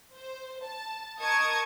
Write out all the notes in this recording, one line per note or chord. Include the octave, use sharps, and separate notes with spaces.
C5
A5
A#4 D#5 A5 C#6 D#6 G#6